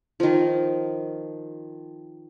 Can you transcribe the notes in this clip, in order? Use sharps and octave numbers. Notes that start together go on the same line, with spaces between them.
D#3 F3